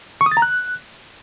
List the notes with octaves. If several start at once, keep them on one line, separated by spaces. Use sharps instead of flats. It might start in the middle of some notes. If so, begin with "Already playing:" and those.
C#6
D#6
A6
A#5
F#6